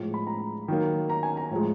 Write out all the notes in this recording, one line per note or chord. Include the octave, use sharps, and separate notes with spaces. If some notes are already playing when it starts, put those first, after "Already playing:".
Already playing: A2 F3 G#3
B5
A#5
D#3 F#3 A#3
A#5
G#5
A#5
A2 F3 G#3